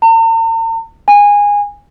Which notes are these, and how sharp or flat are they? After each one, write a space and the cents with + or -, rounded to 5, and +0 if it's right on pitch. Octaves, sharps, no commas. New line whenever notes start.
A#5 -45
G#5 -20